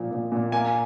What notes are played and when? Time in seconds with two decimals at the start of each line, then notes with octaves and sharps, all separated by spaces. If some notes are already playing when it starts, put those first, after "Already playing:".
Already playing: A#2 F3
0.11 A#2
0.32 A#2
0.52 A#3 G#5